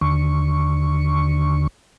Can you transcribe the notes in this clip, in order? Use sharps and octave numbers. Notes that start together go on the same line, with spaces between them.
D#2 D3 C#6